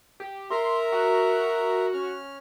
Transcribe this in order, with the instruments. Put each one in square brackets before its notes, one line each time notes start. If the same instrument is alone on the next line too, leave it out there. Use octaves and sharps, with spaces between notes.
[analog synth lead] G4
[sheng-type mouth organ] A#4 E5 A#5 [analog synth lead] C6
[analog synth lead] F#4
[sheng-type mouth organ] C#4 F6